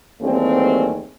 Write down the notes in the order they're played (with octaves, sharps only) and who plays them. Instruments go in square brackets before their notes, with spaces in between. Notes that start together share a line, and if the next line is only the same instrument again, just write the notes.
[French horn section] D#2 E3 G3 A3 C4 G#4